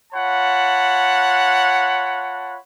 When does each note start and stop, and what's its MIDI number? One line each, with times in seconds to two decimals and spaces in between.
0.13 2.57 65
0.13 2.57 73
0.13 2.57 78
0.13 2.57 81
0.13 2.57 83